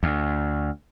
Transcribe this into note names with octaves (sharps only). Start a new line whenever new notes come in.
D2